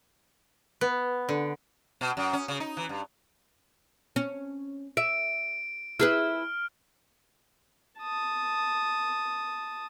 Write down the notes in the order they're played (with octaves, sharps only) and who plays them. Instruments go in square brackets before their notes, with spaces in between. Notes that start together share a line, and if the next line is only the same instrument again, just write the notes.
[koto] B3
D3
[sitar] B2
F#2
C#4
C#3
D#4
E3
G2
[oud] C#4
[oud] E5 [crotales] D7
[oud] E4 G#4 B4 [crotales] F6
[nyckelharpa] A5 D#6